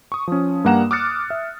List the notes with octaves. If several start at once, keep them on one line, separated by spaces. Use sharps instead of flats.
C#6 D#6
F3 C#4
G2 G3 A#3 F#5 A#5 E7
D6 D#6 F6 F#6 A6 C#7
E5